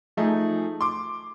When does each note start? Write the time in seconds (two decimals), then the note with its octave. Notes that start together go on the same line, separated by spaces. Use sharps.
0.17 F3 A3 D#4 G#4
0.81 C6 D6